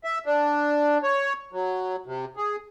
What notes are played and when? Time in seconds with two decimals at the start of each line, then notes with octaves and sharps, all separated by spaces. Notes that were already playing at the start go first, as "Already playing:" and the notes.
0.04 E5
0.26 D4
1.03 C#5
1.53 F#3
2.06 C3
2.37 G#4